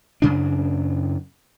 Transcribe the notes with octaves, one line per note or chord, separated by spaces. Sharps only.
F#2 C#3 D4